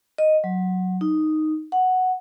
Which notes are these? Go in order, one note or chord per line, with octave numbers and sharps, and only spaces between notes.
D#5
F#3
D#4
F#5